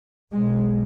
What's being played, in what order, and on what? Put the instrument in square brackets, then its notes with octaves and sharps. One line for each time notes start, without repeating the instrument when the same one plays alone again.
[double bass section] B1 B2 G#3